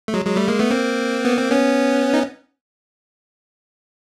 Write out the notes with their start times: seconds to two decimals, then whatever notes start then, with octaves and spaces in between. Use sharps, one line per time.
0.08 A3
0.14 F#3 G#3
0.25 F#3 G#3
0.36 G3 A3
0.47 G#3 A#3
0.59 A3 B3
0.70 A#3 C4
1.25 B3
1.37 C4
1.51 B3 C#4
2.14 D#4